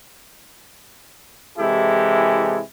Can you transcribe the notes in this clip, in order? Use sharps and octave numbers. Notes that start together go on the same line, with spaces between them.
C3 E3 G#3 E4 G4 A4